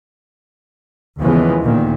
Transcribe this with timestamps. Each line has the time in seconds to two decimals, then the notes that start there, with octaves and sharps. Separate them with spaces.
1.20 D#2 C#3 E3 F3 G#3 B3
1.62 D2 A#2 D#3